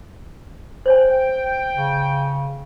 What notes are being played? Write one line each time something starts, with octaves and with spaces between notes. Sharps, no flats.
C5 C#5 G5 G#5
C#3